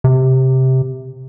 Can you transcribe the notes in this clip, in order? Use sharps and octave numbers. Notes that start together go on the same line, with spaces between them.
C3